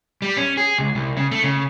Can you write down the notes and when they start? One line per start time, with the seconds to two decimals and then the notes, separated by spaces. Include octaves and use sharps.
0.22 G3
0.37 C#4
0.57 G#4
0.78 C#2
0.95 C2
1.17 C#3
1.32 A3
1.44 C#3